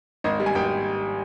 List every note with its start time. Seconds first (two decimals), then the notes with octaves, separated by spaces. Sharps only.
0.24 G#1 D#5
0.40 G3
0.46 G#5
0.55 G#1 G5